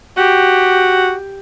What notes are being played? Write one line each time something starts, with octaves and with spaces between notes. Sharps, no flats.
F#4 G4